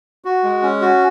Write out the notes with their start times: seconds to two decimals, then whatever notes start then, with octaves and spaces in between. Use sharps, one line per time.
0.25 F#4
0.44 G#3
0.63 C#4
0.81 F#4